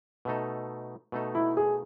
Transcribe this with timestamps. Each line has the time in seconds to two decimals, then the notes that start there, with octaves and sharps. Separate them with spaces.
0.25 B2 A3 D#4 A4
1.12 B2 A3 D#4 A4
1.35 E4
1.57 G#4